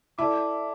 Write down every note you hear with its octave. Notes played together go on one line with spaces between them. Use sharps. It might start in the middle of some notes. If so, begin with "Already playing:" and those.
E4 A4 D5 A5 D6